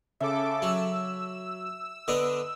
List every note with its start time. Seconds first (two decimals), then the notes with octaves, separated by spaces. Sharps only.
0.21 C#3 A4 E5 D6
0.62 F#3 E6
2.08 D3 B3 D4 D#5